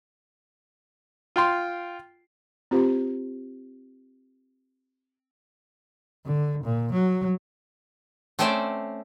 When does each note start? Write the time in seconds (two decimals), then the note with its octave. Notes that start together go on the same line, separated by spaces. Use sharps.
1.36 F4 G5 C6
2.71 C4 F4 G4 C5
6.26 D3
6.64 A#2
6.93 F#3
8.39 A3 C4 C#4 C5 D5 E5